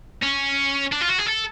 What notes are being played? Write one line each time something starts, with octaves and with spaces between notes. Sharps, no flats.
C#4
D4
F4
F#4
G#4
A4